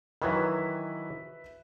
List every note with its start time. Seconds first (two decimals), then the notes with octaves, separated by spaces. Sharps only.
0.22 D#3 E3 F#3 B4 E5 B5